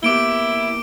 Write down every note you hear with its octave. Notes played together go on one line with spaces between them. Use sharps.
A#3 B3 E4 G4 D6 D7 G7